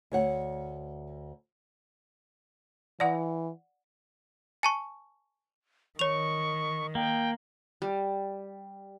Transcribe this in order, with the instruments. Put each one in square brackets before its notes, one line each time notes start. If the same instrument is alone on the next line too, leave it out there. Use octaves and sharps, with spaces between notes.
[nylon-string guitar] D2 C#5 F#5
[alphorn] E3 [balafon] D5 F#5
[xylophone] G#5 A5 C#6
[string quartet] D#3 [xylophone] C#5 F7 [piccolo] C#6
[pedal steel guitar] A#3 [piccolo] G5
[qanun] G3